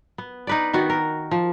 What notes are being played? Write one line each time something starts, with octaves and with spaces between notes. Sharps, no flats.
B3
D#4 B4 D5
D#3 B3 F#4
A#4
F3